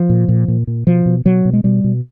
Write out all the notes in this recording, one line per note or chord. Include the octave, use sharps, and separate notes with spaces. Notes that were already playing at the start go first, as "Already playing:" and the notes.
Already playing: F3
A#2
A#2
A#2
A#2
B2 F3
B2
B2 F#3
B2
G#3
B2 G3
B2